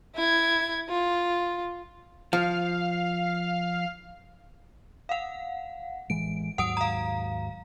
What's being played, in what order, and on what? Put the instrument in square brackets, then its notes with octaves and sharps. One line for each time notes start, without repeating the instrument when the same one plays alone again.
[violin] E4 G#6
F4
[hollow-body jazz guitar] F3 [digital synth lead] F5
[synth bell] F5 F#5
[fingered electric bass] A1 E3 G#3 [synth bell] D7
[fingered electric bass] D#2 G#2 F#3 [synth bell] F#5 D#6 D7
[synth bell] F5 A#5